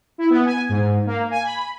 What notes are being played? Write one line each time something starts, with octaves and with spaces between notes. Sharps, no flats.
E4
B3
G#5
G#2
A#3
G#5
B5